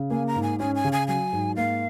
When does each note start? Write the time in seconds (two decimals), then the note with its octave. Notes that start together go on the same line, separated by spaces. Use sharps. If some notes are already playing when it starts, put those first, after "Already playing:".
Already playing: C#3
0.10 A#3 G#5
0.27 A#5
0.36 G#2
0.43 G#5
0.59 C#4 G#5
0.75 G#5
0.84 C#3
0.92 G#5
1.08 F#3 G#5
1.33 G#2
1.56 A#3 F5